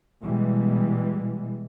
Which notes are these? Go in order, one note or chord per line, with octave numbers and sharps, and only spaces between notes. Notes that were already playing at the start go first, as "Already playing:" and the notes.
B2 E3 G3 G#3